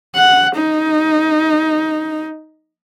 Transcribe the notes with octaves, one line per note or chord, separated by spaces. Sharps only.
F#5
D#4